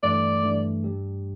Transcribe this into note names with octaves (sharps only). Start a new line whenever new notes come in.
G2 E3 A3 D5
G2 E3 A3
G2 G3 D4 G4